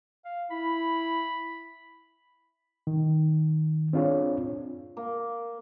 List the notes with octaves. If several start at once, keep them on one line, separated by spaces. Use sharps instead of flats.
F5
E4 B5
D#3
C4 D4 F4 G#4 C#5
A#3